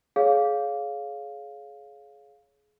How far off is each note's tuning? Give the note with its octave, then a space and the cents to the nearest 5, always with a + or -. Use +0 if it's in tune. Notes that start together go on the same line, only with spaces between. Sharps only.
G#4 +25 C#5 +10 F5 +5